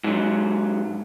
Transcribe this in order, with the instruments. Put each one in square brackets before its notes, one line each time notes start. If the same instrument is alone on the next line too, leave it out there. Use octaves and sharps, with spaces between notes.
[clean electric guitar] G#2 F#3